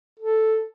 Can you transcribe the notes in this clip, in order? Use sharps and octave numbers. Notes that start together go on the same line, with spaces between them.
A4